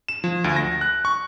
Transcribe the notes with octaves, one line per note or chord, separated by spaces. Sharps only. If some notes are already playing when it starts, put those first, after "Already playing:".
E7
F3
D2
A#6
F#6
C#6